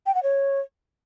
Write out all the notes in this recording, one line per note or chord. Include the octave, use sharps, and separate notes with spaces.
G5
F#5
C#5